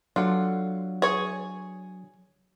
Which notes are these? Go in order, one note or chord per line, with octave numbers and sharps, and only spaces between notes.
F#3 D4 F4 A4 F#5
G#4 C#5